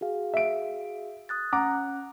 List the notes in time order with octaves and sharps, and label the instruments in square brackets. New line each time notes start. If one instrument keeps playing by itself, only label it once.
[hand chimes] F#4 G#4 F5
[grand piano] E5 D7
[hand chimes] D#6 F#6 A6
[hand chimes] C#4 F#6 [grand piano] F#5 A#5 D6